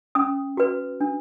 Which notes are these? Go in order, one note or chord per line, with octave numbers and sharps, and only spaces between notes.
C#4 D#6
F#4 B4
D4